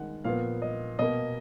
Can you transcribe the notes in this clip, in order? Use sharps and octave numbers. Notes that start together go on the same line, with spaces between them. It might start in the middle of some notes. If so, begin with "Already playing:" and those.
Already playing: D#3 G#3 F#5
A#2 F3 B3 F5
D#5
B2 A#3 D#5